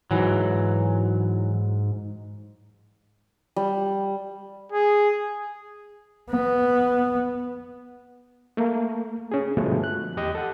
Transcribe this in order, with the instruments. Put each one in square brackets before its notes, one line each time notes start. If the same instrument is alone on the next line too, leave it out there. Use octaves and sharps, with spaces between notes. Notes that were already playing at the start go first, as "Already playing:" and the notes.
[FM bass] G#2 [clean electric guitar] E3 F#3
[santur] G3
[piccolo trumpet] G#4
[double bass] B3
[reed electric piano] A3 A#3
C#4 G#4
G2 B2 D3 F3 G#3 A3
F#6
E2 G4 D#5
A4 F#5